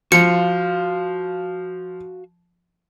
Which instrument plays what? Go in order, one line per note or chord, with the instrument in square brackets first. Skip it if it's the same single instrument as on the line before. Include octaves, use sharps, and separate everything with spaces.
[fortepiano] F3 [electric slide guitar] F#4 F5 [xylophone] C#7